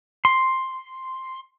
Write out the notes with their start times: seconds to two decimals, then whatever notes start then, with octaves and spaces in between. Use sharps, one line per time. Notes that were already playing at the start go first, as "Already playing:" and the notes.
0.25 C6